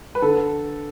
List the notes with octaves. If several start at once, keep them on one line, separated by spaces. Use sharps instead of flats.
B4
D3 A4